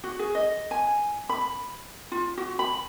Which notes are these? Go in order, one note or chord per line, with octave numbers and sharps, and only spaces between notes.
F#4
G#4
D#5
G#5
B5
F4
F#4
B5